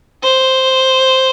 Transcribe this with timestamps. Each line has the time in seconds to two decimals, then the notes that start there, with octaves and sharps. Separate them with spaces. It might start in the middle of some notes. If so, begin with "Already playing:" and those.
0.24 C5